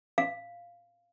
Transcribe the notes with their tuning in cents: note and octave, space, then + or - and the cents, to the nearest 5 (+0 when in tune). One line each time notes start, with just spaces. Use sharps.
F5 -5